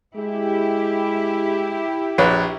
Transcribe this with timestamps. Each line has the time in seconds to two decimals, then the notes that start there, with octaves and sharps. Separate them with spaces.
0.16 G#3 E4 G4
2.18 A#1 B4 C#5